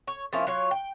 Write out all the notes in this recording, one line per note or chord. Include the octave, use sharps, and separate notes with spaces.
C#5
F3 A#3 C#4 E4
F#3 F4 C#5
G5